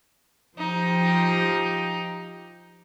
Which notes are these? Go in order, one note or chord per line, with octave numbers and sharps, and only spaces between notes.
F3 D#4 G4